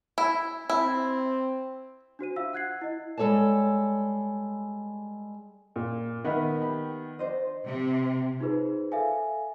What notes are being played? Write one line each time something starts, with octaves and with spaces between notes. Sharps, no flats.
E4
C4 E4
D4 F#4 C5 D#7
F4 E5 F5 E6
F#5 F#6 G#6 C7
E4 D#5
G3 G#3 A4 C#5 D5 A5
A#2
D#3 B3 A#4 D#5 E5
G4 B5
D4 C5 D#5
C3
D#4 F4 G#4 B4 C5
A4 E5 F5 G#5